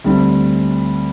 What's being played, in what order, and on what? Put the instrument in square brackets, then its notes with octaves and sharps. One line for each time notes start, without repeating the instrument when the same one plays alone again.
[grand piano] D2 D3 G3 C4